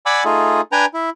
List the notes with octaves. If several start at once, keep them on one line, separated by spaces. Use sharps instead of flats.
D5 F#5 G#5 B5 D6 E6
A3 D#4 F4 G#4
D4 B4 G5 G#5 A#5
E4